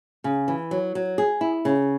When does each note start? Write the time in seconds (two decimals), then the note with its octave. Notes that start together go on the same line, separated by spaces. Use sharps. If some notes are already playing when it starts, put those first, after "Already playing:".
0.24 C#3
0.48 E3
0.71 F#3
0.95 F#3
1.18 G#4
1.41 E4
1.65 C#3